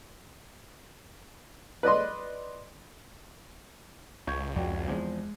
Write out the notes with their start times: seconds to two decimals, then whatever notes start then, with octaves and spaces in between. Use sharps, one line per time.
1.83 B4 D5 D#5 C6
4.27 C#2 C#6 G6 G#6
4.56 F2 F#4 D5 G5
4.88 E2 F3 G#3 C4